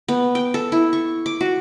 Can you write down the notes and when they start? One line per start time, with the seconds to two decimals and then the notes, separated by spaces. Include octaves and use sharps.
0.08 B3
0.35 G5
0.54 A4
0.72 E4
0.93 C#6
1.26 D6
1.41 F#4